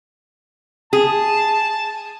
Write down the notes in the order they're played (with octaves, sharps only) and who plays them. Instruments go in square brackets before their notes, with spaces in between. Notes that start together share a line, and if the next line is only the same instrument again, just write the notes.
[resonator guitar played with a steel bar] G#4 [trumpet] A5